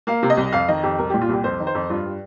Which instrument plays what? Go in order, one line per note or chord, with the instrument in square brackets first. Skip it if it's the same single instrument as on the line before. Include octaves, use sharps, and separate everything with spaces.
[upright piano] A#3 F5
C3
D#5
C2
F2 F5
D#3 D#5
F2 G4
C2 A#4
A#2 G4
F4
C2 G4
F2 C5
D#3
C5
F2
G2 F4
G3